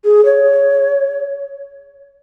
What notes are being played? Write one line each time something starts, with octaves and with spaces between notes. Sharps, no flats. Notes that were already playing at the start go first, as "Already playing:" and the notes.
G#4
C#5